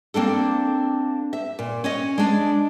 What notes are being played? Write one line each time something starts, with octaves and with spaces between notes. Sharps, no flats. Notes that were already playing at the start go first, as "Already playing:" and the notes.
A#3 C4 D4 A4
E5
A#2
C#4 C#5 D#5
G#3 D4